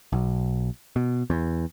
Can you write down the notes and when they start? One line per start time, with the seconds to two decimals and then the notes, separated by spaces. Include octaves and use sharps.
0.12 B1
0.96 B2
1.30 E2